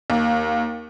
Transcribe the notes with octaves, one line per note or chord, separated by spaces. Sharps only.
D#2